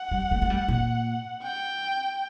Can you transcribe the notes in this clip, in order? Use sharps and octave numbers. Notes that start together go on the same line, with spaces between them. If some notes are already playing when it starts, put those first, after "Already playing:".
Already playing: F#5
G3
A3
A3
G3
A#2
G5